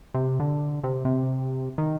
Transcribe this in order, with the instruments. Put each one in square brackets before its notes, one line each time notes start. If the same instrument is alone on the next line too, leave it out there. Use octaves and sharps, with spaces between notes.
[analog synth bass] C3
D3
C3
C3
D#3